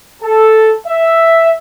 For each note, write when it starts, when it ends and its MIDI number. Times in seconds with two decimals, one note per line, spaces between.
0.22 0.73 69
0.87 1.52 76